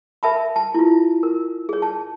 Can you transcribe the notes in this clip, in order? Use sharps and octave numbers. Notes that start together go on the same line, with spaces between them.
A#4 E5 A5 B5
A5
E4 F4
A#4
G#4 C#5
A5